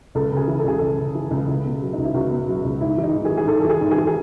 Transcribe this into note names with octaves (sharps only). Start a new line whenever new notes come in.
C#2 A4
C#3 G#4
E3
A4
C#2 G#4
C#2 A4
C#3
E3
C#2
C#2
B2
F#3
C#2 D#4
E4
C#2 F#4
B2
F#3
C#2
G#2 E4
E3
D#4
G#2
G#4
E3
G#4
G#2 A4
E3 A4
G#4
G#2
G#4
E3
G#4